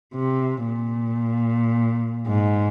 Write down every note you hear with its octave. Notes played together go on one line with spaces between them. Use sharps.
C3
A#2
G#2